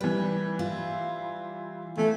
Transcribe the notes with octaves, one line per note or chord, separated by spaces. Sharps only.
E3 G3 B4
E4 F4
E3 A3